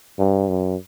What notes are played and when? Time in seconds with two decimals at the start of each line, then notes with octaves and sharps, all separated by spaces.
0.19 G2
0.49 F#2